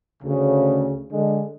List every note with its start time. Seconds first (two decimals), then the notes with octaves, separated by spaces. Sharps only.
0.23 D2 C#3
1.11 D3 G#3